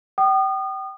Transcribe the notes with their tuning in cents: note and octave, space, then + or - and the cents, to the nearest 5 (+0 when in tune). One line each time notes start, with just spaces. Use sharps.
G5 -30 D#6 -35